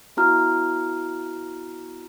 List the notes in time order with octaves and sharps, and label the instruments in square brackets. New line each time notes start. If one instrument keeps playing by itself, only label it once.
[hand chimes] B3 E4 F#4 A#5 F6